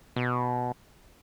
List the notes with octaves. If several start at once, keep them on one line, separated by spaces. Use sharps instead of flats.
B2